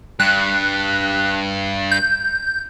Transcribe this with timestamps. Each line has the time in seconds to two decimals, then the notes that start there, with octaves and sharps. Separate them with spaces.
0.20 G2 F#6
1.91 G6